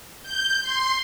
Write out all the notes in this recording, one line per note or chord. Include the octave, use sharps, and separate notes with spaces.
G6
C6